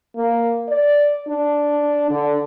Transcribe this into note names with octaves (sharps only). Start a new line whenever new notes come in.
A#3
D5
D4
D3